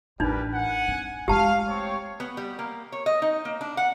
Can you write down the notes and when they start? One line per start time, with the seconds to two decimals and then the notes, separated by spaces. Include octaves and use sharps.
0.20 A1 G3 D4 D#4 A#4 B4
0.54 F#5 G#5
0.88 C4
1.28 G#3 A3 G4 F5 A5
1.68 C4 C#5
2.20 B3
2.37 G3
2.59 A#3
2.92 C#5
3.06 D#5
3.22 D#4
3.45 A#3
3.61 D4
3.77 F#5